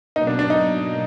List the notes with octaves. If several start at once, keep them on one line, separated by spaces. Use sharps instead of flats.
B2 F#3 A#3 D#4
D4
D4
D#4